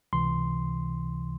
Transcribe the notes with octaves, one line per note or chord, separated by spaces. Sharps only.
C#2 C3 E3 C6